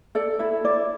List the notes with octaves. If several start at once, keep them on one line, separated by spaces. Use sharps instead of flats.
A4 D5
E4 E5
E4 D5